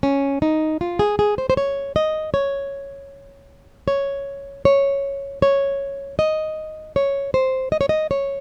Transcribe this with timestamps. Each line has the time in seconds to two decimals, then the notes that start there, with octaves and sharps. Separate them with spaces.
0.03 C#4
0.42 D#4
0.81 F4
0.99 G#4
1.19 G#4
1.38 C5
1.50 C5
1.57 C#5
1.96 D#5
2.34 C#5
3.88 C#5
4.65 C#5
5.42 C#5
6.19 D#5
6.96 C#5
7.34 C5
7.72 D#5
7.81 C#5
7.89 D#5
8.11 C#5